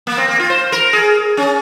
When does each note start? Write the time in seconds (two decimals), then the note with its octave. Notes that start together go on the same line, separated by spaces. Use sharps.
0.07 A#3
0.17 C4
0.28 A#3
0.39 F4
0.50 C5
0.72 A#4
0.93 G#4
1.37 C#4